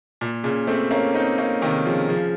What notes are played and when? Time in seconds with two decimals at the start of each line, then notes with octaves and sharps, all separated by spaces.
0.21 A#2
0.44 A#2 C#3
0.67 A3 C4
0.91 A#3 C#4
1.14 C4 D#4
1.38 A#3 C#4
1.62 C3 D#3
1.85 C#3 F3
2.09 C#3 F3